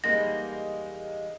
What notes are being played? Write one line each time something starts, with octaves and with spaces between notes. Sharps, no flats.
E2 G3 G#3 A#3 D#4 A#6